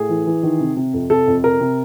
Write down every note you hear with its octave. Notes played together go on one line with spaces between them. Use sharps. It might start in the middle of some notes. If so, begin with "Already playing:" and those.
Already playing: A2 G#4
E3
E3
D#3
C3
C3
F2
C3 A4
F2
C3 A#4
C3